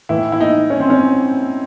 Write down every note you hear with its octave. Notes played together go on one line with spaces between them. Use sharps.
A2 E3 E4
E4
D#4
C#4
C4
C#4